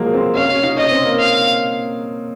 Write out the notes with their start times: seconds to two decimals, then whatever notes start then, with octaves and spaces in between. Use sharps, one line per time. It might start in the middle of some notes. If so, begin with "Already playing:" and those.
Already playing: F3 F#3 G#3 A#3
0.14 C4
0.35 C#4 F5
0.49 C#4
0.63 D#4
0.77 C#4 D#5
0.91 C4
1.05 A#3
1.19 F5